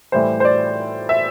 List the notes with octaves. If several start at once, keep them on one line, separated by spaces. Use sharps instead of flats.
A2 E3 G3 C5
C5
D5
E5